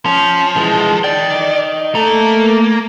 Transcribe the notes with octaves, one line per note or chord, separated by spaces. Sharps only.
F3 C#4
E3 G#3
D#4 D5 G5
A3 A#3